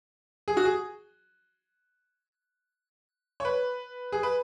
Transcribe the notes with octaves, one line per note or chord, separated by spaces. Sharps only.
G#4
F#4
G#4
C#5
B4
G#4
B4